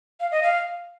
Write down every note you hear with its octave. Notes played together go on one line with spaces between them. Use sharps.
F5
D#5
F5